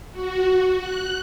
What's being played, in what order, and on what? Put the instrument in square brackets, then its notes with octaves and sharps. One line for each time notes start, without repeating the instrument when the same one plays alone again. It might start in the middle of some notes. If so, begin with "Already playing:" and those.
[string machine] F#4
F#6